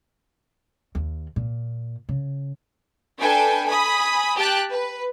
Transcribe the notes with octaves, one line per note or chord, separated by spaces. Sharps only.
D#2
A#2
C#3
D4 A4 B4 G5 G#5
G#5 B5 D#6
G4 G5 A5 F#6
B4